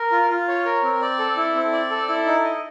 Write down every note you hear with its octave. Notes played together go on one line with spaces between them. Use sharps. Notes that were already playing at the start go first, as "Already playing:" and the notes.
Already playing: A#4
F4
F4
C#5
A#4
C4
D5
A4
E4
C4
D5
A4
E4
D#4
D#5